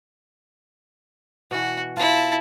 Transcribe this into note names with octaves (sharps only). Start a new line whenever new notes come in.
B2 E3 F#4
E4 F4 A5